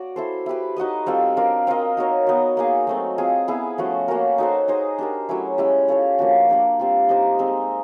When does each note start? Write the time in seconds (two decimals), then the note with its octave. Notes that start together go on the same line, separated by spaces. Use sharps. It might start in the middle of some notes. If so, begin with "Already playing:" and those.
Already playing: F#4 D5
0.16 E4 A4 C5
0.46 E4 G4 B4
0.76 D#4 F#4 B4 D#5
1.06 G3 C4 F4 A4
1.37 D4 F4 A#4 D5
1.67 C4 F4 A#4 D#5
1.97 D#4 F#4 A#4 C#5
2.27 B3 D#4 F#4
2.57 A#3 D#4 G#4
2.87 F#3 A3 C4
3.18 C4 F4 G#4
3.48 B3 E4 G#4 B4
3.78 F3 A3 C#4 F#4
4.08 A#3 C#4 F#4 A#4
4.38 D#4 F#4 A4 C5
4.68 D#4 G#4 C5 D#5
4.99 D4 G4 A#4
5.29 F#3 A3 C#4 E4
5.58 G#3 C#4 E4 G4
5.88 C#4 F4 A4 C#5
6.19 F3 A#3 D4 F#4
6.49 A#3 D4 G4
6.79 G3 C4 F4
7.09 D#4 G4 C5 D#5
7.39 G#3 C4 D#4